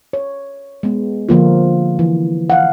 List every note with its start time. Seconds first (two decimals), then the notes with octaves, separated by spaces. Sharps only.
0.13 C#5
0.83 G#3 B3
1.29 D3 F3 A#3 F4
1.99 E3
2.50 F5 F#5